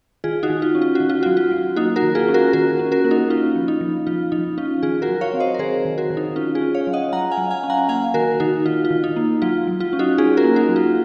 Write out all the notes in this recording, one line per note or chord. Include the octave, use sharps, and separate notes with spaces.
D#3 F4 G#4
D#4 F#4
D#3
F4
C#4
F4
D#3 F#4
F4
F#3 F#4
F4
F#3
A#3 D#4 F#4
F#4 A#4
D#3
F4 G#4
C#4
F#4 A#4
D#3 F#4 A#4
C#4
F#4 A#4
A#3
D#4 F#4
C#4 F4
F3
D#4
F3
F3 F4
F3 D#4
C#4 F4
D#3 F4 G#4
F#4 A#4
F#3
C#5 F5
C4
C5 D#5
A#4
D#3 G#4 C5
D#3
F#4 A#4
D#3
D#4
C#4 F4
F4 G#4
C#4
C#5 F5
F#3
D#5 F#5
F#3 F#5 A#5
F5 G#5
F#3
F5 G#5
C#4
F#5 A#5
A#3 F5 G#5
D#3 F#4 A#4
D#3 D#4 F#4
D#3 F4
F4
D#3
D#4
A#3
F#3 F4
F#3
F4
C#4
D#4 F#4
C#4 F4 G#4
F#4 A#4
A#3
D#4 F#4
F#3
F4